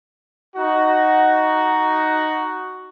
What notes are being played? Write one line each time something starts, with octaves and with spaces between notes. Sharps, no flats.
D#4 F#4